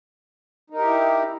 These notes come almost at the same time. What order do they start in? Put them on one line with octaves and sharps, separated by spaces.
D#4 A#4 G4 E4